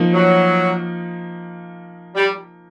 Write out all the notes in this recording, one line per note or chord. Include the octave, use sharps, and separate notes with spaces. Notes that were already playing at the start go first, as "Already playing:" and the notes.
Already playing: F3 A#3 D#4
F#3
G3